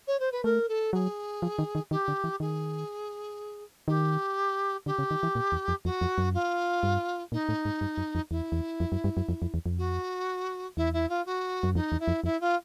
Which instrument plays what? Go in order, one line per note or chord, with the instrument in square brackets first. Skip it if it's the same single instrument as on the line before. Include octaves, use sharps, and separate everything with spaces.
[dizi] C#5
C5
B4
[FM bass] A3 [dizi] A#4
[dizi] A4
[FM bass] F#3 [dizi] G#4
[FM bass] F3
D#3
D#3
[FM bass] D#3 [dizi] G4
[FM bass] D3
E3
[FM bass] D#3 [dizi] G#4
[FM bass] D#3 [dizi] G4
[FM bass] D3 [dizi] G4
[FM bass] C#3
D#3
E3
A#2
E2
F2
[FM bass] F2 [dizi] F#4
[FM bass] F2
F#2
[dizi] F4
[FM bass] G2
[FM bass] A#2 [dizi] D#4
[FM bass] A2
G#2
G2
F#2
F2
[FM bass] E2 [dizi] E4
[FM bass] E2
F2
F#2
G2
F#2
F2
F2
E2
F2
[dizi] F#4
[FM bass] E2 [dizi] E4
[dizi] E4
F4
F#4
[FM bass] F#2
[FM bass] F2 [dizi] D#4
[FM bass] E2
[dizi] E4
[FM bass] F2
[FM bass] F2 [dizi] E4
[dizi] F4